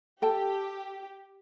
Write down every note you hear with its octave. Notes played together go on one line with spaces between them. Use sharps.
G4 A4 G5 A5